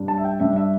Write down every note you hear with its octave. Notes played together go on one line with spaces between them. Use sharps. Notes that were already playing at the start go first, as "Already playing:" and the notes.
Already playing: G2 G3 D4
A5
E5
G5
G2 G3 D4 E5
E5